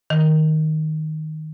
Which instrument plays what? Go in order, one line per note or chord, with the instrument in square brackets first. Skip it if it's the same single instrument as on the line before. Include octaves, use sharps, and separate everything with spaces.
[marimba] D#3